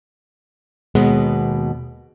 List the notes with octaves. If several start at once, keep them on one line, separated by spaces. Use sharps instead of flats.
D#2 B2 G#3 B3